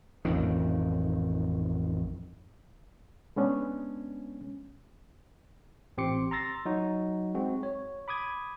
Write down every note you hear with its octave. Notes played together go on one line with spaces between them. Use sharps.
A1 F2 D#3
G#3 B3 C#4 D4
A1 C4 G4 C6 D6 C#7
A#5 C6 E6 A6 A#6
F#3 D#4 F#4
G#3 C4 F#4
C#5
B5 D6 D#6 G#6